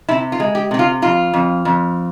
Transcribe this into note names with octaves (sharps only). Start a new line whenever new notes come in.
C3 E4
F4
G#3
G4
C3 G4
F4
F2 F4
F2
F2